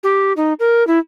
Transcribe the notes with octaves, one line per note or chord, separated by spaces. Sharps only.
G4
D#4
A#4
E4